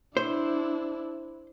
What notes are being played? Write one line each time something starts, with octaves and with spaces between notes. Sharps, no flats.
D4 E4 C5